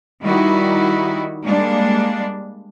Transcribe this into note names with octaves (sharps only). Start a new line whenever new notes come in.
D#3 G3 D#4 E4 F#4
G3 G#3 A#3 D4